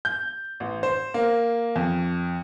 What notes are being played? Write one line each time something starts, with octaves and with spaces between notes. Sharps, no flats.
G6
A1
C5
A#3
F2